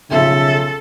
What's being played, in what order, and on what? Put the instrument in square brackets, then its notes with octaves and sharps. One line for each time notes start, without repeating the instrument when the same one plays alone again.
[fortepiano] B1 F3 [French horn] C#3 [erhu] A4 [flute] E5